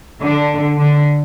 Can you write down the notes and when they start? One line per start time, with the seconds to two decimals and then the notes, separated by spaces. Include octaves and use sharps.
0.21 D3
0.77 D3